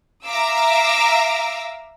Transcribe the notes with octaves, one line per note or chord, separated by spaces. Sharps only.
E5 F5 A#5 D6 E6